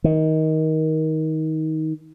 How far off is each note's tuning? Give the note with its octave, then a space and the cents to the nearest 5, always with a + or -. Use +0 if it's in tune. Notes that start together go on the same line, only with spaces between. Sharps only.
D#3 +20